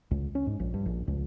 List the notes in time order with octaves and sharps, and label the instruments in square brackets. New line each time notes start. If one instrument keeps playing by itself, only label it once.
[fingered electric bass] C#2
C#4
G#2
A#1
G2
A#1
C#2